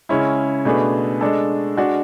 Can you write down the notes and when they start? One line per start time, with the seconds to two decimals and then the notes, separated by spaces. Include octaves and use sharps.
0.09 C#3 G#3 C#4 E4
0.65 B2 A3 D4 G#4 B4
1.21 G#3 D4 A4
1.77 G#3 D4 F#4